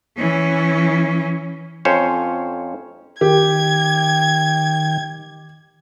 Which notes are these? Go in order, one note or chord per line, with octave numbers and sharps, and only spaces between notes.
E3 C#4
F2 C#4 C5 C#5
D#3 G4 G5 G#6